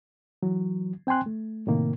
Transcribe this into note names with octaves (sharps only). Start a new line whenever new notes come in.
E3 F#3
C4 G5 G#5 C6 F#6
A3
A2 C3 D#3 A#3